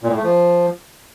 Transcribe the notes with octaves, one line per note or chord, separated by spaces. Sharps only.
A#2
A2
A3
F3